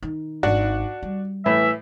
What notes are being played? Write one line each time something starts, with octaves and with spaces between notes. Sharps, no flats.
D#3
G#1 D4 F#4
G3
A2 E3 E5